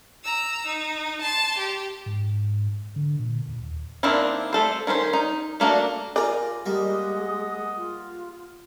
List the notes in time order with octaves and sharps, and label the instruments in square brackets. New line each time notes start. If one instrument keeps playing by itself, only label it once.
[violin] A#5 E6
D#4
A5 C6
G4
[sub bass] G#2
D3
A#2
D#2
[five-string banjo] D#3 A#3 C4 D4 E4
A3 A4 C5
D#3 C#4 F4 C5
D#4
A3 A#3 D4 F#4
[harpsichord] F4 G#5 A#5 [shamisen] A#4 D5
[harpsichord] G3 A#3 [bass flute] G#3 [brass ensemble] G#4 D#5 F#5
[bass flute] F4